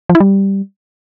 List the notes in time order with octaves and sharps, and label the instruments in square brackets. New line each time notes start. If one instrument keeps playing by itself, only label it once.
[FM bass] F3
E4
G3